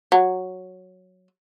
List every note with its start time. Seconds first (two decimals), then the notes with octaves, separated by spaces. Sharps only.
0.12 F#3